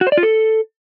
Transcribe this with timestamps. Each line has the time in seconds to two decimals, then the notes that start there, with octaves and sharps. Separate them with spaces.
0.01 F#4
0.07 C5
0.12 D5
0.17 F4
0.23 A4